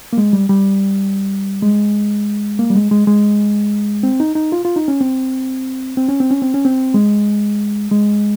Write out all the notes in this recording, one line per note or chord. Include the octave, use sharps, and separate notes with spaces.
A#3
G#3
G3
G3
G#3
A#3
G3
G#3
G#3
G#3
C4
D#4
D#4
F4
F4
D#4
C#4
C4
C4
C#4
C4
C#4
C4
C#4
C4
G#3
G#3